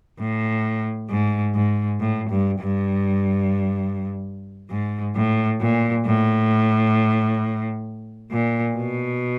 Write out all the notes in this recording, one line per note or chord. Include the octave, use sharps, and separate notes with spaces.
A2
G#2
G#2
A2
G2
G2
G#2
A2
A#2
A2
A#2
B2